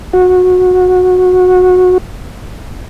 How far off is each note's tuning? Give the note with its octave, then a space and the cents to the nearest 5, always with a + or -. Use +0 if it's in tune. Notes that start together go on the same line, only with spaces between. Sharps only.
F#4 -20